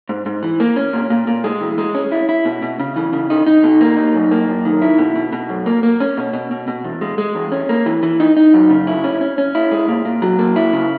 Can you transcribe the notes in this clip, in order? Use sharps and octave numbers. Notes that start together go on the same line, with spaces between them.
G#2
G#2
E3
A#3
C#4
A#2
A#2
A#2
G#3
E3
G#3
C#4
E4
E4
B2
B2
C#3
E3
C#3
D#4
D#4
B2
A#3
D#4
F#2
A#3
F#2
D#3
E4
B2
B2
B2
F#2
A#3
A#3
C#4
B2
B2
B2
B2
E2
G#3
G#3
E2
C#4
A#3
E3
E3
D#4
D#4
F#2
C#3
E4
C#4
C#4
C#4
E4
G#3
A#2
A#2
F#3
A#3
E4
C#3